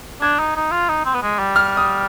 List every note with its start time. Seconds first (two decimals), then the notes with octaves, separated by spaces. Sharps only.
0.22 D4 G#6
0.39 D#4
0.56 D#4
0.72 F4
0.89 D#4
1.06 C4
1.14 B3
1.23 G#3
1.39 G3
1.56 F6
1.77 D#6